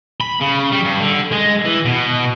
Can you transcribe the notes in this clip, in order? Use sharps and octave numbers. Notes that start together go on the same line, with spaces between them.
B5
C#3
G3
G2
D3
G#3
E3
B2